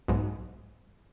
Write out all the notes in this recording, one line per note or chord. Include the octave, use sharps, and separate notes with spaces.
B1 G#2